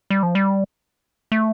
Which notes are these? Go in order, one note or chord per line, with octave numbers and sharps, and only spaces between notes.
G3
F3
G3
A3